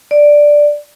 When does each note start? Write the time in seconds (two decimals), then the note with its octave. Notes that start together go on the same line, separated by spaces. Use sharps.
0.11 D5